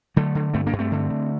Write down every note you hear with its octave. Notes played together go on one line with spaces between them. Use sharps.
D3 F#3 A3
D3
G2 A3 C4
A#3 D4
G2
A3 C4
D3
D3